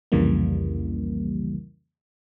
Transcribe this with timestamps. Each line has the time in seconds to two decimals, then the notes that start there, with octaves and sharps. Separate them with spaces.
0.12 C2 F2 C#3 E3 G3 A#3